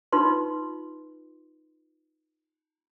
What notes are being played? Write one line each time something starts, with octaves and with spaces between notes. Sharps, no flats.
D#4 F4 B4 C6